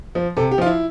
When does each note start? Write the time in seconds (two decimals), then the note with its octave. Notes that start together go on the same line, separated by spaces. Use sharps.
0.15 F3
0.37 C3 A4
0.51 G4
0.58 F3 F4
0.66 E4